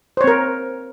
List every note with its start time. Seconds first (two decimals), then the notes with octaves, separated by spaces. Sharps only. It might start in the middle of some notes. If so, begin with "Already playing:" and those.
0.17 C5
0.21 C#5
0.24 C4
0.28 A#4